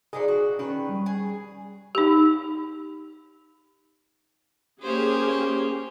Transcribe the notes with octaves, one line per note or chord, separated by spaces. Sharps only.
F3 D4 D#4 G#4
F#4
D#3 C#4 B4 C#5
G3
G#4
D#4 G4
A#3 C#4 G4 G#4 C5 C#5